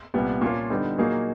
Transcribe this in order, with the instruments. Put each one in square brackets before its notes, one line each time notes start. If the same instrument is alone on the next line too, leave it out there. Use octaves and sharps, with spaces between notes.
[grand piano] C2 A#2 G3 B3
A#2 F3 A#3 C#4 F4
D3 G3 B3 D#4
A#2 F#3 A#3 D#4 G#4